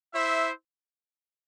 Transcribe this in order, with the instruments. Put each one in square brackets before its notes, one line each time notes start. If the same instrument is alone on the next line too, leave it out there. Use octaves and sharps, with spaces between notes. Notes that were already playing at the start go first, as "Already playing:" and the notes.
[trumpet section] E4 C5 E5